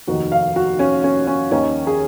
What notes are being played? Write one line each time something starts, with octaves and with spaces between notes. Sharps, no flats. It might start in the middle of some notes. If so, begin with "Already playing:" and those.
F1 D#2 D#3 F#4
F5
F#4
C#4
C#4
C#4
D#2 D#3 C#4
G#4